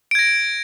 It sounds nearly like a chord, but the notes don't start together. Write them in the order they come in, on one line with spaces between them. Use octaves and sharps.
D7 G#6 A#6